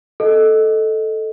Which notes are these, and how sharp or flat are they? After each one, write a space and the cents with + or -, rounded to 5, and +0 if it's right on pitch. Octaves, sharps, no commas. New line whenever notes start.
A4 -5 D#5 +0